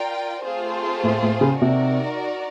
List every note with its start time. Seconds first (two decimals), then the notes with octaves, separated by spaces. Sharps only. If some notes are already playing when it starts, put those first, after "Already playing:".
Already playing: F4 A#4 D5 G5
0.45 A3 C4 F4 G#4 C5
1.03 A2
1.23 A2
1.41 C#3
1.61 C3 D#4 F#4 A#4 D5